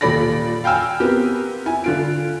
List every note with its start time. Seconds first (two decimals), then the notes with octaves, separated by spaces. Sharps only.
0.01 D#1 A#2 A4 D5 B5 A#6
0.64 F5 G5 G#5 E6 F6
1.00 B3 C4 G4 A#4
1.66 E4 G#5
1.84 D3 F4 D7